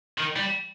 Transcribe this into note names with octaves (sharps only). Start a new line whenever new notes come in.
D#3
G3